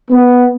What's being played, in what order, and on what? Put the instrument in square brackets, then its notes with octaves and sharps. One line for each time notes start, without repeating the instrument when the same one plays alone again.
[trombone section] B3